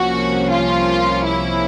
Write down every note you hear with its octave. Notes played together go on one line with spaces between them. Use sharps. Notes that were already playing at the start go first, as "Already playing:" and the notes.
Already playing: C2 C3 F3 A#3 C#4 F#4
F4
E4